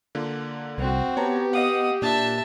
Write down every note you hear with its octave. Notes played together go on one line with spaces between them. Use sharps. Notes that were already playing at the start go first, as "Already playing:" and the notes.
D3 A#3 F4
C2 C4 F#4
B3 G4 C#5 A5 A#5
D#5 F5 F#5 D#6
A#2 D4 E5 A5